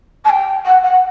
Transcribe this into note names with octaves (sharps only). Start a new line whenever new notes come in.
A5
G5
F#5
F#5